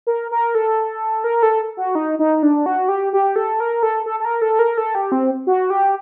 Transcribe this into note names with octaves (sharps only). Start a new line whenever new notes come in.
A#4
A#4
A4
A#4
A4
F#4
D#4
D#4
D4
F#4
G4
G4
A4
A#4
A4
A4
A4
A#4
A4
A#4
A4
G4
C4
F#4
G4